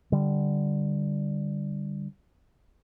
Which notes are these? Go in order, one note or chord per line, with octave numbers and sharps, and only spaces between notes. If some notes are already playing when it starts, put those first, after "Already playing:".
D3 G3